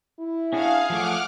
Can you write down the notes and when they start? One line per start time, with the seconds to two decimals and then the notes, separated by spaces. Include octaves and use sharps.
0.19 E4
0.53 C#4 D4 F#4 G#4 F5
0.90 F3 A3 C#5 F#5 D6 F6